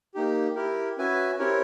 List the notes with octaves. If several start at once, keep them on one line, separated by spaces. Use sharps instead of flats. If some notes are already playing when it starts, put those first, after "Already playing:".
A#3 D#4 G4
E4 G4 A#4
C#4 F#4 B4 E5 G#5
C4 E4 G4 A#4 C#5